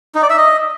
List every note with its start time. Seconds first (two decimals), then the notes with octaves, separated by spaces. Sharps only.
0.15 D#4
0.23 D5
0.30 E5
0.38 D#5